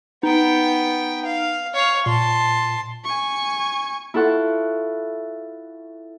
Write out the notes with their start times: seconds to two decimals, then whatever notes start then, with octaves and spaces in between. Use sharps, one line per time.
0.23 B3 D#4 G5
1.26 F5
1.74 C#5 F5
2.06 A#2 A5 C6
3.04 G#5 C#6
4.14 E4 F4 A4 F#5 C#6